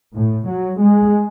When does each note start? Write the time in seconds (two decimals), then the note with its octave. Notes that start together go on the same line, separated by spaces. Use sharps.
0.13 A2
0.46 F#3
0.78 G#3